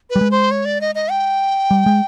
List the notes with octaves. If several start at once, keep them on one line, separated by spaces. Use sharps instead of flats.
B4
G3
G#3
C5
C#5
D5
D#5
D#5
G5
G3
G#3